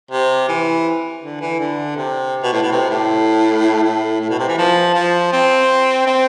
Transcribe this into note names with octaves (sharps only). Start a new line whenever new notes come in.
C3
E3
D3
E3
D3
C3
B2
A2
B2
C3
A2
A2
A2
B2
C3
E3
F3
F3
C4
C4